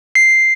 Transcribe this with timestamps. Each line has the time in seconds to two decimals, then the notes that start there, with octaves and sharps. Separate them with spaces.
0.15 C7